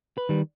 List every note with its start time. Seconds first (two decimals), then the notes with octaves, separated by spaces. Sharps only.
0.18 B4
0.29 D#3 G3